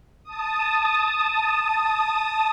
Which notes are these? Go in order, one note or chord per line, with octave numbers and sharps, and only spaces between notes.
A5 D#6